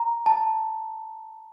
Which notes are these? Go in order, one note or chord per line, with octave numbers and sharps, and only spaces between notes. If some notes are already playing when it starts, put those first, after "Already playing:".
Already playing: A#5
A5